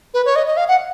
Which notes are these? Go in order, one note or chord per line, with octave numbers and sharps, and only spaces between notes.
B4
C#5
D#5
D#5
F5
F#5